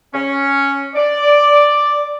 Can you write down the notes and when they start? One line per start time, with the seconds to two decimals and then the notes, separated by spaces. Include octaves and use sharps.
0.13 C#4
0.94 D5